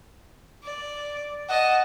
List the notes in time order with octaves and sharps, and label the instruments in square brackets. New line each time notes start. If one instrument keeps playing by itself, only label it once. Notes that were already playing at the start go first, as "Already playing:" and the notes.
[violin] D5
[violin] D#5 A5 [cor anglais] F#5